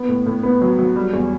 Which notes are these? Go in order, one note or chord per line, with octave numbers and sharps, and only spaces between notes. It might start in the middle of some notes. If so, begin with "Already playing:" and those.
Already playing: B3
A2
A2
B3
F#3
F#3
G3
E2